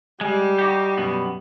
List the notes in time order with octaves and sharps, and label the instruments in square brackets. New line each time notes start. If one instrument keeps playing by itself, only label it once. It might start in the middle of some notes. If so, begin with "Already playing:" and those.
[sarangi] G3 [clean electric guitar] G#3
[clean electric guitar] D#4 F#4 G4
F#2 B2 B3